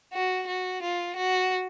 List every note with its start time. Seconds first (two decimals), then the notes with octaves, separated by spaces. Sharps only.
0.13 F#4
0.47 F#4
0.82 F4
1.17 F#4